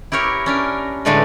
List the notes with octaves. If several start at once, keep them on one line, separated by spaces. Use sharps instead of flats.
E4 G4 A#4 C#5
C#4 D4 A#4
A2 D3 G#3 A3 D4 B4